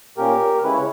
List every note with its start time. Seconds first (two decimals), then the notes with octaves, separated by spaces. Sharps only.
0.17 A#2 A#3 C#4 G4 A#4
0.63 C#3 G#3 C#4 E4 B4
0.73 C#5